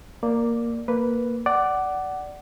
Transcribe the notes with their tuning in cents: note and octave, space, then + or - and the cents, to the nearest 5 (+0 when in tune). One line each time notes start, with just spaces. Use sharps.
A#3 +0 D5 +0
A#3 +0 B4 +0
D5 +0 F#5 +20